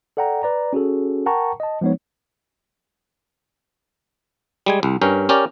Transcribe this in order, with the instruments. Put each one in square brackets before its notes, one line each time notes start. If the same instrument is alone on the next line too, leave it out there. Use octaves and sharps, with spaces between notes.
[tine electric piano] A4 D5 F#5 G5 A#5
B4 D5 A#5
C#4 F#4 G#4 A4
A#4 F#5 G5 A5 A#5 C#6
D#5 A5
F3 G#3 B3 D#4 C#5
[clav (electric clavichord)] G3 G#3 G#5
C2
G2 C#4 A#4 G5
C#4 G4 A#4 D5